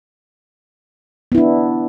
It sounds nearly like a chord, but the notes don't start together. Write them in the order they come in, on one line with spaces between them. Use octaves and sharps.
B3 E4 D4